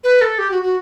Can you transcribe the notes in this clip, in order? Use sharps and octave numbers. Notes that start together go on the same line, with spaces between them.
B4
A4
G4
F#4
F#4